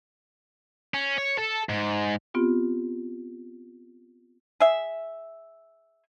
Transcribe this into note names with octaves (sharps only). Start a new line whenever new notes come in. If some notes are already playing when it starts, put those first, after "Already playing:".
C#4
C#5
A4
G#2
B3 C4 F4 G4
G#4 E5